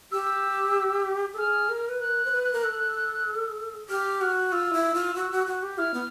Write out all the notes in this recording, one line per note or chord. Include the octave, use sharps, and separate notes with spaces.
G4 E6
A4
G#4 F6
A#4
B4
A#4 F#6
C5
B4
A#4
A4
G4 F6
F#4
F4 E6
E4
F4
F#4
F#4
F#4
G4
E4 F6
B3